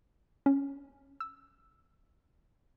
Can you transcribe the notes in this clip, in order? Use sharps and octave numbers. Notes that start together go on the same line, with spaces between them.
C#4
E6